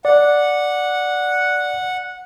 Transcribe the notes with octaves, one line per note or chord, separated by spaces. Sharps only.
D5 F#5